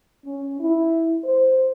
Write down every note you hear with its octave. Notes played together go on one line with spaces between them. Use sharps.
C#4
E4
C5